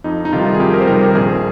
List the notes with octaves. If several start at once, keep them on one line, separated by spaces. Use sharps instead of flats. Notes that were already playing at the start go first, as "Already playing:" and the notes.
F2 D#4
D#4
C3 D#3 G3 F4
G#4
F2 G4
A#4
C5
C3 D#3 G3 A#4
C5
A#4
A#1 G#4